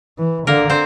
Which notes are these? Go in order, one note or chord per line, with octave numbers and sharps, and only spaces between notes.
E3
D3 A#3 A#4
C4 C5